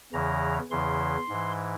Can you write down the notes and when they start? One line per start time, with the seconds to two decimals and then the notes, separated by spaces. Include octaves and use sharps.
0.13 E2 C#3 E3 A#5
0.71 E2 C#3 E3 C6
1.29 G#2 E3